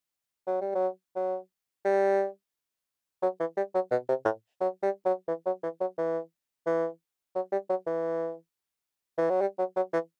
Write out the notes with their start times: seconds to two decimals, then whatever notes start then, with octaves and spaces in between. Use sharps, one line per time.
0.47 F#3
0.61 G3
0.75 F#3
1.16 F#3
1.85 G3
3.22 F#3
3.40 E3
3.57 G3
3.74 F#3
3.91 B2
4.09 C3
4.25 A2
4.60 F#3
4.83 G3
5.05 F#3
5.28 E3
5.46 F#3
5.63 E3
5.80 F#3
5.98 E3
6.66 E3
7.35 F#3
7.52 G3
7.69 F#3
7.87 E3
9.18 E3
9.30 F#3
9.41 G3
9.58 F#3
9.76 F#3
9.93 E3